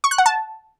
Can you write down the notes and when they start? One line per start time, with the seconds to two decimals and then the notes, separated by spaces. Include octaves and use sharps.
0.04 C#6
0.11 F#6
0.18 F#5
0.26 A5